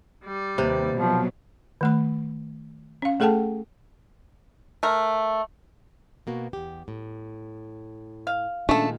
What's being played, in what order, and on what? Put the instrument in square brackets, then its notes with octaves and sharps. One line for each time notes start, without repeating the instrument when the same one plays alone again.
[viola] G3 D5
[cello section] D#2 [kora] C3 B4
[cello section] B2 F#3 [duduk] F3
[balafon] D#3 A3 B5
C#4 F5
A3 G#4 A4 F#5 G5 A5
[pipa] A3 A#4
[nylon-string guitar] B2 A#3 F#4
E2 G4
A2
[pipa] F5
[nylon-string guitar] A#2 D#3 G#3 [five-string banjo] A3 A4 [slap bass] C#4 D4